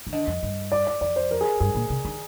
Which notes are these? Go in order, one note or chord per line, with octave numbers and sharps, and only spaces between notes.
D#3
D3 D#5
F2
G2
D5
D5
F2 D5
C5
A#4
G#4
G2 G#4
A#2
C3
D#3